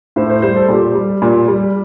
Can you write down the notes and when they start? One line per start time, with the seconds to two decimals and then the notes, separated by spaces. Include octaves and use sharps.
0.16 A2 C5
0.30 C5
0.42 G3 C5
0.56 A4
0.68 A#2 G4
0.95 G3
1.22 A#2
1.48 G3